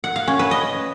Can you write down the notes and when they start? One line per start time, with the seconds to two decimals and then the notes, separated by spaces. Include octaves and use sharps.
0.04 F#5
0.16 F5
0.28 C#4
0.39 B4
0.51 D#5